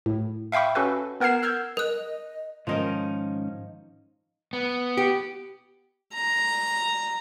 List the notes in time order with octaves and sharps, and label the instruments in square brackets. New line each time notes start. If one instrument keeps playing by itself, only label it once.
[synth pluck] A2
E5 F5 G5 B5 C#6
C#4 F#4 A4 B4
B3 A#4 F#5 G#6 C7 E7
E6 F6 G6 G#6
[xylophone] A#4 F#6 [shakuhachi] D#5
[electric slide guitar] G#2 D#3 C#4 [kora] F3 D#4 A#4
[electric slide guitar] B3
[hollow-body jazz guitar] G4
[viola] A#5